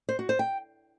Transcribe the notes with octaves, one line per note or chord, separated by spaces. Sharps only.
C5
F#4
C5
G5